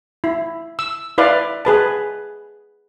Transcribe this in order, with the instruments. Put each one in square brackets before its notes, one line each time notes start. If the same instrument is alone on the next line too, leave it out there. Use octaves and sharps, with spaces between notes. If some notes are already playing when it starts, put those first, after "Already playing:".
[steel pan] E4
E6
E4 B4 D5 F5
G#4 B4 A5